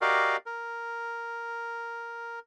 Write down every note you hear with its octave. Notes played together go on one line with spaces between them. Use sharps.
F#4 G4 A#4 D5 D#5 F5
A#4